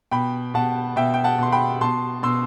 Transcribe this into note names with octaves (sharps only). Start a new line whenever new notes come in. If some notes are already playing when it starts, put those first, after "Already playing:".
B2 G5 B5
B2 F#5 A5
B2 E5 G5
G5
F#5 A5
B2 C6
G5 B5
B2 A5 C6
B2 C6 E6